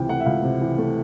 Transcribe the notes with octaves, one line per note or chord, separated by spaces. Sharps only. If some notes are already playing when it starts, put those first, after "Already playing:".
Already playing: C#2 C3 E3 G5
A3 F#5
E5
C#2 F5
C3
E3
A3